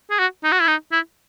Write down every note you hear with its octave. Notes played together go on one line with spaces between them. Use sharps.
G#4
F#4
D#4
F#4
E4
D#4
E4